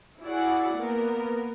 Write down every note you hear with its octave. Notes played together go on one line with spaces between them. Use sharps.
E4 F#4 G#4 D5 F#5
A#3 B3 A#4